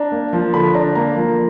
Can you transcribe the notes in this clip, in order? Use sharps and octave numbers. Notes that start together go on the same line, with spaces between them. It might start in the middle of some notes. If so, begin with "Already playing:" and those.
Already playing: D4 A#5
A#3
F3
D3 B5
D4 A#5
A#3 A#5
F3